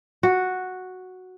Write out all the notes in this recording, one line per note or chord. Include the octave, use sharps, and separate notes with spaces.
F#4